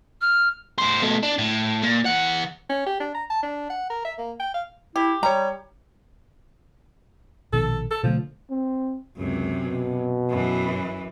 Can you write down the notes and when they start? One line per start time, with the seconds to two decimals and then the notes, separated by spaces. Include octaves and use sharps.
0.21 F6
0.78 A2 C5
1.02 B2 A3
1.23 D4
1.38 A2
1.83 A#2
2.06 E3 F#5
2.70 C#4
2.86 G4
3.00 D4
3.15 A#5
3.30 A5
3.43 D4
3.70 F#5
3.90 A#4
4.05 E5
4.18 A#3
4.40 G5
4.54 F5
4.96 E4 G4
5.23 G3 C#5 G5 A#5
7.53 A#1 B2 D#3 A4
7.91 A4
8.03 B2 D3 F3 A3
8.50 C4
9.17 C#2 F#2 C3
9.65 B2
10.29 F#2 E3